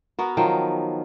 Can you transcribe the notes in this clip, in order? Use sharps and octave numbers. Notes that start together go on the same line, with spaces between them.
B3 F#4 A#4
D#3 F3 F#3 G5